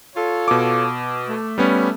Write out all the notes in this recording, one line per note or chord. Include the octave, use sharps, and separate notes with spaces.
F4 A4 C#5
B2 D6
A3
G3 B3 C#4